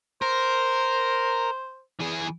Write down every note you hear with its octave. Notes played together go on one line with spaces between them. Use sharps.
A#4 C5
E3 G#4